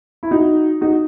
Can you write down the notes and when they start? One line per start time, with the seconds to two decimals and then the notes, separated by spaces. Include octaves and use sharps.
0.23 E4
0.31 D#4 F#4
0.81 D#4 F#4